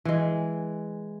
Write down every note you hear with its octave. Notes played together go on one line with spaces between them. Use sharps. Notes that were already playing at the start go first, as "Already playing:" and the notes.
E3 G#3